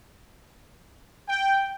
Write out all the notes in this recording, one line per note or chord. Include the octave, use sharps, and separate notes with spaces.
G5